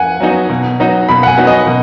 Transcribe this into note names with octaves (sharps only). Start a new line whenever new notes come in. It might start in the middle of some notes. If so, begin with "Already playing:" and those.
Already playing: F#5 G#5
F#3 B3 D#4 F#4
B2
F#3 B3 D#4 F#4
B2 B5
F#5
G#5
F#3 B3 D#4 F#4
D#5
B2